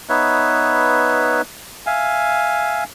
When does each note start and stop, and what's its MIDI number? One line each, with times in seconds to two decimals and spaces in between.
0.09 1.41 59
0.09 1.41 63
0.09 1.41 71
0.09 1.41 73
0.09 1.41 76
1.86 2.84 76
1.86 2.84 77
1.86 2.84 80